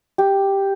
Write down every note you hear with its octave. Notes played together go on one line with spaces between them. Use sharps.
G4